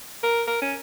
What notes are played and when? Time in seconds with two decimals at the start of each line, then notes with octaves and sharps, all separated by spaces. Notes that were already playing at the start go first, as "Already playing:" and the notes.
0.23 A#4
0.47 A#4
0.62 C#4